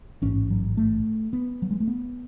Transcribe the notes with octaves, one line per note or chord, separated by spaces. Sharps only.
A1 G#2 C#4
F#3
A3
B3
F#3
G#3
A3
B3